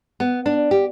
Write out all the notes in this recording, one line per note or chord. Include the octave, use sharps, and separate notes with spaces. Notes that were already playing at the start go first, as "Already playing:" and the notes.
B3
D4
G4